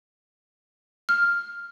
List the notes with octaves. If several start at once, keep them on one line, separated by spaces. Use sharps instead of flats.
F6